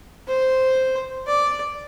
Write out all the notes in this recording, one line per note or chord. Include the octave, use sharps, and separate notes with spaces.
C5
D5